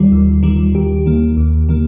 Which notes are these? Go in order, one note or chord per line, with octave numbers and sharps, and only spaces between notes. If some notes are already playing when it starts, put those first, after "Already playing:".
Already playing: D#2 D#3 G3 F4
D#2
D#3 G3
D#2 G4
D#3 A#3
D#2
D#3 A#3